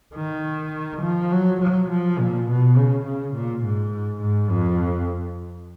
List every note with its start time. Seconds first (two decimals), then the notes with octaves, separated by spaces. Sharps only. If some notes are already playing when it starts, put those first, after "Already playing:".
0.15 D#3
1.02 F3
1.32 F#3
1.61 F#3
1.89 F3
2.18 A#2
2.47 B2
2.76 C#3
3.05 C#3
3.34 A#2
3.64 G#2
4.21 G#2
4.50 F2